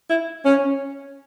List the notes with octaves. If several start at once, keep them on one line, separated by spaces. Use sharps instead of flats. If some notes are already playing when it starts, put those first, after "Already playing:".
E4
C#4